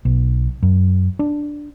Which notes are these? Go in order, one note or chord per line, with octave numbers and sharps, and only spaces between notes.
B1
F#2
D4